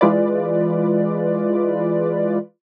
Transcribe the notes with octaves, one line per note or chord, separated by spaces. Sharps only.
E3 G#3 F4 B4 D5